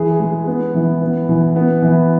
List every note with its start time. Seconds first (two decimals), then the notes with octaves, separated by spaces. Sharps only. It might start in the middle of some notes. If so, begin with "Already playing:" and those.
Already playing: E3 G#4
0.20 G#3
0.47 B3
0.74 E3
1.02 B3
1.29 E3
1.56 B3
1.82 E3